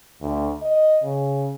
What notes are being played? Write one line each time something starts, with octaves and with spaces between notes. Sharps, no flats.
D2
D#5
C#3